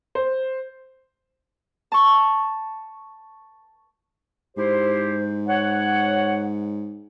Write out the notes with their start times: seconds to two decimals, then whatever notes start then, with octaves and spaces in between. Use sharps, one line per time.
0.15 C5
1.92 A5 C#6
4.57 G#2 E4 G4 C5
5.47 C#5 F#5